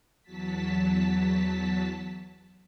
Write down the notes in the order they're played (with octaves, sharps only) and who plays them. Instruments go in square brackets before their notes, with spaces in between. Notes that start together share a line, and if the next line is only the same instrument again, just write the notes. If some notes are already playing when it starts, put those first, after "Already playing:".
[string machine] E2 F#3 A5 B6